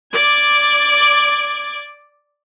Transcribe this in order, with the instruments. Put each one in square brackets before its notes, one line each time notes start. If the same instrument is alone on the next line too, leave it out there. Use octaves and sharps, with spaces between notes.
[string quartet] D5 D6 G#6